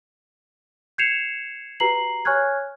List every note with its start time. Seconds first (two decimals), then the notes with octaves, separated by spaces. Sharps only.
0.98 G6 G#6 C7 C#7 E7 F7
1.80 F#4 G4 B4 A#5 C7 F#7
2.25 C#5 G#5 C#6 F6 F#6 G#6